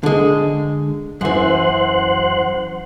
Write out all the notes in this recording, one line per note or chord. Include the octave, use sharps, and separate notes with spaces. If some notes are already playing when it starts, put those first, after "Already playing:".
D3 G#3
F#2 E3 C5 F#5